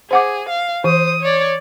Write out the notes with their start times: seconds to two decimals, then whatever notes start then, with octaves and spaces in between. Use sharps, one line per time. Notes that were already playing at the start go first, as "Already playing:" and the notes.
0.11 G#4 C5 F#5 D6
0.49 F5
0.84 E3 C5 D#6
1.21 C#5 D5